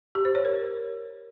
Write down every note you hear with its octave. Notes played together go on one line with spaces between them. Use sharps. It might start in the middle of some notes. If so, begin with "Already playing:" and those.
G4
C5
C#5
A#4